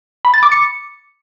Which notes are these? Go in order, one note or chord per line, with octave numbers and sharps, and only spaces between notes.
B5
A6
D6
C#7